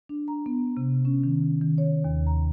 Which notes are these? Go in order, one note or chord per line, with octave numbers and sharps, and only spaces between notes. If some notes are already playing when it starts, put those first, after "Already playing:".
D4
A#5
B3
C3
C#4
D#3
D#3
C#5
D#2
A#5